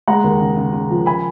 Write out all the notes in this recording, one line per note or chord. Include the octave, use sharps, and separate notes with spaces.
G#3 F#5 A#5
D#2
C#3
C#3
C#3
F3
G#5 B5